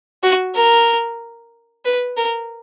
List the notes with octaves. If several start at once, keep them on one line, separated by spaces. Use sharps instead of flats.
F#4
A#4
B4
A#4